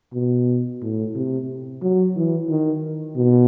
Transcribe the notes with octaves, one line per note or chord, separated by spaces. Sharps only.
B2
A2
C3
F#3
E3
D#3
B2